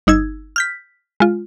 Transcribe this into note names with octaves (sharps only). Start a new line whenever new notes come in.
G1 D#4 E6 G#6
F6 G6 B6
G#3 F4